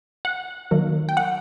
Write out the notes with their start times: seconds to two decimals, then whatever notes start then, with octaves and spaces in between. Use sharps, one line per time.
0.25 F#5
0.71 D#3 F#3 A#3
1.09 G5
1.17 F#5